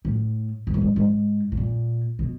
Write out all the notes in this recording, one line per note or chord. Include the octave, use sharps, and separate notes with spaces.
A2
G#2
A2
G#2
G#2
A2
A#2
B2